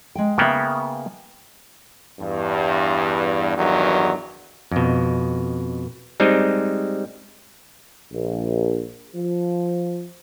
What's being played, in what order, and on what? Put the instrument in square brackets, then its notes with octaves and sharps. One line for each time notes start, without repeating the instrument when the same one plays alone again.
[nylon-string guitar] G#3 G5
[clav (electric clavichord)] C#3 A#3 B3 [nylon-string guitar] E5 G5
[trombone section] E2 G2
E2 G2 D#3 F#3
[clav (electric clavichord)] F2 B2
G3 G#3 C4 D#4
[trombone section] A#1
F3